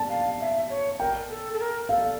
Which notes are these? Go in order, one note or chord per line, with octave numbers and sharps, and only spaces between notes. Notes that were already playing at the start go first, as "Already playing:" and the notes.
Already playing: A5
F5
E5
C#5
A#4 G5
A4
A4
A#4
A4 F5